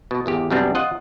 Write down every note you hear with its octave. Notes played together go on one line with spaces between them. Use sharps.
B2
G#1 E2 G4
F#2 C3 G3 B3 C4 D4
F4 D#5 F#5